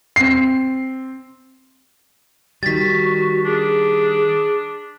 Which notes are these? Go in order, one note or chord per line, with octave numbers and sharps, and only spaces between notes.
C4 C7
D#3 G3 F#4 A6 B6
D4 G#4